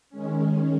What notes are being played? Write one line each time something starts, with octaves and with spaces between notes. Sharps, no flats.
D#3 G#3 C#4